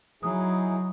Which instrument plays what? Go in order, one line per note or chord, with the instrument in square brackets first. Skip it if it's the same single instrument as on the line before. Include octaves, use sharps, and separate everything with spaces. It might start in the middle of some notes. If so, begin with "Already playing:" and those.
[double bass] F#3 [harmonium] D#4 E4 G#4 [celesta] D#6